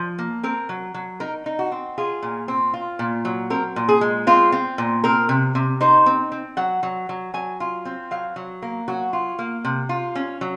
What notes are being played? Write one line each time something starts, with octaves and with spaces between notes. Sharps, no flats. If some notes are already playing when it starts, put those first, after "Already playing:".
Already playing: F3
A#3
C4 A#4
F#3
F#3
D#4 A#4
D#4
F#4
C4
F4 G#4
A#2
C4
F4
A#2
F#3
C4 A#4
A#2
G#4
G#3
C4 F4
C4
A#2
C4 A#4
C3
C3
D#4 C5
C4
C4
F#3 F#5
F#3
F#3
F#3 G#5
F4
C4
F#3 F5
F#3
A#3
F#3 F#4
F4
A#3
C3
F4
C#4
F#3